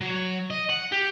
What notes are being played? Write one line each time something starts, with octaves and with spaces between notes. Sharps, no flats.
F#3
D#5
F#5
G4